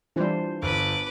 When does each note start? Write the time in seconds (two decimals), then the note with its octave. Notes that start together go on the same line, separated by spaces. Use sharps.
0.16 E3 G3 D4 F4 C5
0.62 G1 B4 D6